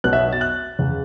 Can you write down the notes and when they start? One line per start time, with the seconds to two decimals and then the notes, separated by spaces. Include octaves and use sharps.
0.04 B1 B2 B3 F#6
0.13 E5
0.33 A6
0.41 F#6
0.79 E2 C#3